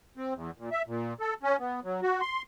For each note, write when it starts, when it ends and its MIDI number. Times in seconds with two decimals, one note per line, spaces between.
0.17 0.34 60
0.35 0.51 40
0.58 0.69 46
0.72 0.82 76
0.87 1.13 46
1.20 1.34 69
1.43 1.57 61
1.59 1.80 59
1.84 2.01 54
2.02 2.21 66
2.21 2.42 84